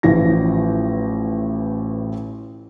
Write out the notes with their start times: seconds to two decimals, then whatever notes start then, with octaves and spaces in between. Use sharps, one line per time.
0.03 A1 A2 E3 F3 A#6